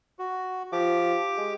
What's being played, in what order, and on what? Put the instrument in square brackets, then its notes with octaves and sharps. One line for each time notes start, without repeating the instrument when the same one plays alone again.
[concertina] F#4
[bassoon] F3 [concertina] G4 D6
[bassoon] G#3